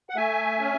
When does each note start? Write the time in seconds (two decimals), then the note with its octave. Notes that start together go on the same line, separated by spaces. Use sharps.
0.10 F#5
0.16 A3 E5 G#5
0.60 C#4